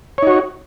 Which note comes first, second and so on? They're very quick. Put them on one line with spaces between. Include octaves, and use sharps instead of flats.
C#5 D#4 F#4